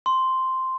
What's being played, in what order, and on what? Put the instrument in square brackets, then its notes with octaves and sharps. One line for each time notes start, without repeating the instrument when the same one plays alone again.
[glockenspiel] C6